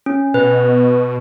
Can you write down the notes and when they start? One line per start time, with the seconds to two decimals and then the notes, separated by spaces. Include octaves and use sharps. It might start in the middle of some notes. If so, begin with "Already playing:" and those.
0.06 C#4
0.34 B2 B4